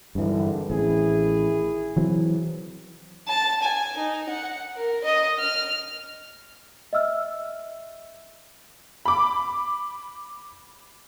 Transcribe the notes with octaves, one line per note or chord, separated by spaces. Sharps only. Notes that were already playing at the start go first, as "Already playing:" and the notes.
G#1 G2 D3 E3
A1 D#3 C4 E4 G#4
E3 F#3 C4
A5
G#5
D#4
F#5
A#4
D#5
F6
D#5 E5 E6 F6
B5 D6